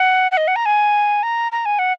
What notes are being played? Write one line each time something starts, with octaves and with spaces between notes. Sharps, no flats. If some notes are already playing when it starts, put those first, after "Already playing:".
Already playing: F#5
F#5
D#5
F#5
A#5
G#5
A#5
A#5
G#5
F#5